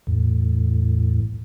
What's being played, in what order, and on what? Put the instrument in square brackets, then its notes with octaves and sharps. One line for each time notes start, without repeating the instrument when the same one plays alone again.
[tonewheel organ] E2 A2